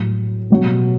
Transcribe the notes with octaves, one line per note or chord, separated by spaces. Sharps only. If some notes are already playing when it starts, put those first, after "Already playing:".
Already playing: A2 F#3
B2 F#3